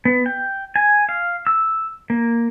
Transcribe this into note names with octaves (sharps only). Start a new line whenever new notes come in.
B3
G5
G#5
F5
E6
A#3